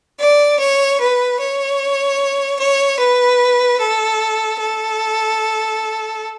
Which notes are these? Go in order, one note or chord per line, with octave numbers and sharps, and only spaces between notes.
D5
C#5
B4
C#5
C#5
B4
A4
A4